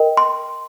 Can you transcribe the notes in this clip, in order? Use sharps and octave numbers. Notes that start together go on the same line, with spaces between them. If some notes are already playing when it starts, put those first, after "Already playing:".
Already playing: A#4 D#5 G5
C6